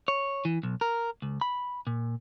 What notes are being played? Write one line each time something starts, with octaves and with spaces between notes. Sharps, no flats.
C#5
E3
B1
A#4
C#2
B5
A#2